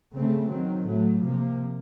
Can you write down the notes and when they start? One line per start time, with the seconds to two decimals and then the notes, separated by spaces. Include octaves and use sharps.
0.14 C#3 A3 C4
0.50 D#3 F#3 C4
0.86 A2 F#3 A3
1.23 C3 F3 A#3